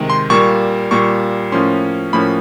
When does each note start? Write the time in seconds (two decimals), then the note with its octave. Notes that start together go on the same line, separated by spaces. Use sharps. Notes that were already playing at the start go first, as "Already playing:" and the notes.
Already playing: C3 D#3 G#3
0.10 C6
0.30 A#2 G3 A#3 C#6
0.91 A#2 G3 A#3 C#6
1.52 A2 F3 A#3 C#4 C6
2.13 A2 F3 A#3 C#4 B5